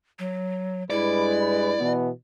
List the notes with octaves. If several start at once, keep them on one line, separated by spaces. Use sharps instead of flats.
F#3
G2 G#3 E4 B4 D5
B2 E3 B3